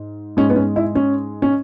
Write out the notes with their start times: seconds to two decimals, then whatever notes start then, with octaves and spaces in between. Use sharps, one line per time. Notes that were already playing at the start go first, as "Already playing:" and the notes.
Already playing: G#2
0.37 G#3 C#4
0.40 G#2
0.50 B3
0.56 C#4
0.76 E4
0.95 C#4
1.42 C#4